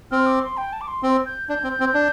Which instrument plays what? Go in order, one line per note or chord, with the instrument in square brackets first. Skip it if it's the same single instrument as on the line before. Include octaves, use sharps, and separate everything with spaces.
[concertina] C4 [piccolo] F6
[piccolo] D6
C6
G5
A5
D6
C6
[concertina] C4
[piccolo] G6
[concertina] D4 [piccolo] G6
[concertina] C4
C4
D4